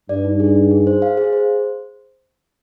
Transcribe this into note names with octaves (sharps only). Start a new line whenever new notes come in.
G2 D5
D#4
G#4
D#4
G#4
C5
F5
G#4
C5